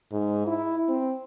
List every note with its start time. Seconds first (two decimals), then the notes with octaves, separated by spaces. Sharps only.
0.12 G#2
0.47 E4
0.89 C4